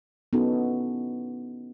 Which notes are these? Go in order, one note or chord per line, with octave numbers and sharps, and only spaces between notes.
B3 C#4 D#4 E4 F#4 A4